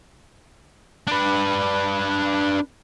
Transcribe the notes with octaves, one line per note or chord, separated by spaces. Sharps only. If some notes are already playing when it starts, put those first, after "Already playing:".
D4 B4